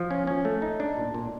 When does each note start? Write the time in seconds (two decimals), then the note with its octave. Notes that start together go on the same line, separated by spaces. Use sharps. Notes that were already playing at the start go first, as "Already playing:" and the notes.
Already playing: F3
0.11 C#4
0.27 C#4
0.45 A3
0.62 D#4
0.80 D4
0.97 A#2
1.14 A#2